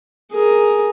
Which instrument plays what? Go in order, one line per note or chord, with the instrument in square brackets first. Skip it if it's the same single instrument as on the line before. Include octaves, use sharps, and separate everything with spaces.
[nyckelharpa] G#4 A#4